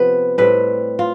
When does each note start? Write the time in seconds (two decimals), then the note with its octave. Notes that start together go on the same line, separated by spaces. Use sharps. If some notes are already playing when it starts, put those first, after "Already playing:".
Already playing: C3 F3 B3 B4
0.38 A2 G3 C4 B4
0.99 F4